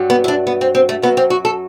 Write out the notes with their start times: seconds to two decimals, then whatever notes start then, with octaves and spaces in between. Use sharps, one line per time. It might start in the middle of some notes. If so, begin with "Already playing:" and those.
Already playing: G2 F#3
0.10 B3
0.24 E4
0.28 D4
0.47 B3
0.61 C4
0.75 C4
0.89 A3
1.02 F#2 F#3 B3
1.17 C4
1.30 F#4
1.45 A4